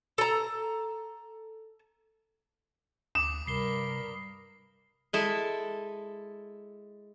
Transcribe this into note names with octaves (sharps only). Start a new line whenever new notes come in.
A4 A#5
D2 D6 D#6 E7
G2 C3 A#4 B5 C7 G7
G#3 E4 A4